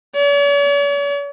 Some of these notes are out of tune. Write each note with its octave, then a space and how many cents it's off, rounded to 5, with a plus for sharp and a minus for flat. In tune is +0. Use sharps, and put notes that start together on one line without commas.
C#5 +45